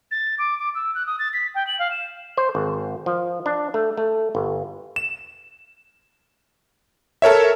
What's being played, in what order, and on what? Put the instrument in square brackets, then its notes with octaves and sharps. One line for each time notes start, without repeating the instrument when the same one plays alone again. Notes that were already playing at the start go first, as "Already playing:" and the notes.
[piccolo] A6
D6
D6
E6
F#6
D#6
A6
B6
G5
F#7
F5
E7
[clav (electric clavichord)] C5
G#1
F3
D4
A3
A3
G1
[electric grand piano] E7
A4 A#4 C#5 E5